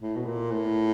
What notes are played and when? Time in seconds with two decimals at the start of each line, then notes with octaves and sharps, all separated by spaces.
0.01 A2
0.16 B2
0.26 A#2
0.52 A2